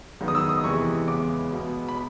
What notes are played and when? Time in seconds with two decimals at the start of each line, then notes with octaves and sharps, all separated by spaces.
0.21 F#2 D#3 G#3 B3
0.28 D#6
0.35 E6
0.49 D#6
0.64 E2 C3 E3 G#3 C#6
1.08 E2 C#3 E3 G#3 B3 D6
1.52 B2 G#3 B3
1.89 B5